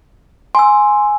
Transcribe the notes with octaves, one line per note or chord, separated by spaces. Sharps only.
G#5 C6 E6